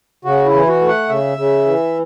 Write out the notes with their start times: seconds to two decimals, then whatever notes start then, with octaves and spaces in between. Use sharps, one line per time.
0.25 C#3 F#4
0.46 E4
0.53 E3
0.67 F#4
0.81 A3
0.88 F#5
1.09 C#3 E5
1.38 C#3
1.66 E3